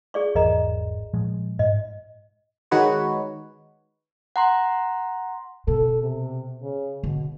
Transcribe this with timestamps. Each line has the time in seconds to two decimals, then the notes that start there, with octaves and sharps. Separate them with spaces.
0.14 G#4 D5 C#6
0.35 G#1 E2 A#4 D#5 A#5
1.14 A#2 F3 G#3
1.59 G#2 D#5
2.71 D#3 G#3 D#4 F#4 B4 C#5
4.36 F#5 A#5 C6
5.67 B2 A4
6.02 C3
6.62 C#3
7.03 B2 D3